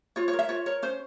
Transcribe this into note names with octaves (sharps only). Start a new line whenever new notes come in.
F4 C#5
C#5
A#4
E5
F4 C#5
A#4 C#5
C#4 C5